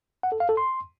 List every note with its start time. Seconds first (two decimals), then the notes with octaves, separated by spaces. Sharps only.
0.23 F#5
0.32 A4
0.40 F5
0.49 A4
0.57 C6